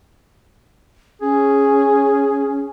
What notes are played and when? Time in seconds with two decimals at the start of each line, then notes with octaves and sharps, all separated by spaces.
1.22 C#4 G#4